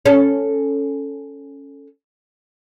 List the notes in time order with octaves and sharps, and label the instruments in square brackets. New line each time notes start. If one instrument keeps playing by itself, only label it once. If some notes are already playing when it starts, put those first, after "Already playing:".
[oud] C#4 A4